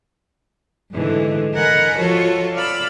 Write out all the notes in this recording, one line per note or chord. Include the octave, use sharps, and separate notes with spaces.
G#2 D3 E3 G#3 A3
A#4 D#5 F#5 G#5 A#5 B5
F3 F4 F#4 A4 C#5
D5 F5 B5 E6